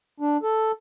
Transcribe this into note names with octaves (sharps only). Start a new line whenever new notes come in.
D4
A4